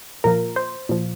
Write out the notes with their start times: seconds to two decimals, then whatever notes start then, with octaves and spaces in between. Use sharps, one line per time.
0.24 A#2 F3 A#4
0.56 C5
0.89 A#2 F3